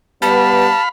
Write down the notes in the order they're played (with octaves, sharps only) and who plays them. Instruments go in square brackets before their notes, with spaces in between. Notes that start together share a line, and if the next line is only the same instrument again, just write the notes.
[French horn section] G3 B3 [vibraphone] G4 B4 [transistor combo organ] F5 B5 [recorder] A5